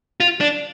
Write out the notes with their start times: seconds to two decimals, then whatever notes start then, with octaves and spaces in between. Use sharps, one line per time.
0.20 F4
0.41 D4